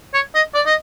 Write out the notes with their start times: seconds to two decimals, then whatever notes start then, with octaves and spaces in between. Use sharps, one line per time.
0.14 C#5
0.35 D#5
0.55 D5
0.66 D#5